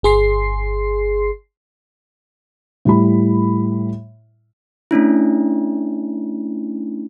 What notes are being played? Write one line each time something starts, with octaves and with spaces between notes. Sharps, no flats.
G1 G#4 C6 C7
A2 G3 E4 B5
A3 C#4 D4 E4